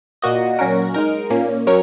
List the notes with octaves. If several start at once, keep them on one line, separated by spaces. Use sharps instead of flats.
A#2 A#3 F#4 D#5
A#2 F#3 C#4 F#4 A#4
G#3 D#4 A#4
A#2 A#3 C#4
F#3 C#4 A#4 C#5